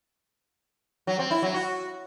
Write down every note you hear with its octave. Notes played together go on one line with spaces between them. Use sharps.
F#3
C4
E4
F#3
F#4